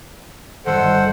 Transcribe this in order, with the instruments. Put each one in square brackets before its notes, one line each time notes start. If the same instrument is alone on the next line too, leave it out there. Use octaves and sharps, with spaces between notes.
[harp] G1 D#3 [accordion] A4 C5 F#5